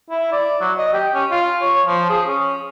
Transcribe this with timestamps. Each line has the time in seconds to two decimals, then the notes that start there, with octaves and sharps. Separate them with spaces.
0.10 E4
0.32 D5
0.61 F#3
0.78 D#5
0.94 G4
1.14 C#4
1.31 F4
1.61 C#5
1.86 F3
2.10 G#4
2.28 C#4